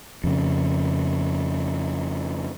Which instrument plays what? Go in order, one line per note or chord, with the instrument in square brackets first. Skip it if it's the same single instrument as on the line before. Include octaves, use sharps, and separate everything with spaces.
[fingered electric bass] F2 C#3